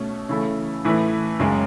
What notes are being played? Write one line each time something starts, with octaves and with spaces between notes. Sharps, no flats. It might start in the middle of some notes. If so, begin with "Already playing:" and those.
Already playing: B2 A3 C#4
C#3 E3 A3 E4 A4
A2 E3 A3 E4 B4
F#1 F#2 C#3 G#3